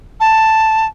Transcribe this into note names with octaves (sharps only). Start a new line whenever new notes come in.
A5